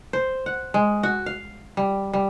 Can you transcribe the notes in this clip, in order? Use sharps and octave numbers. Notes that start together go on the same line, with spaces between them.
C5
F#5
G#3
F#4
F5
G3
G3